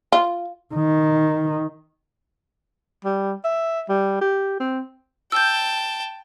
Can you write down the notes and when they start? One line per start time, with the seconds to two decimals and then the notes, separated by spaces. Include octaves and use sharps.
0.12 F4
0.75 D#3
3.05 G3
3.44 E5
3.89 G3
4.21 G4
4.60 C4
5.32 G5 A5 E6 G6